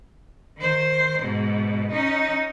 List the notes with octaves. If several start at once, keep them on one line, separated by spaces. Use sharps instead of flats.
D#3 C5
G#2 B2
C#4 D#4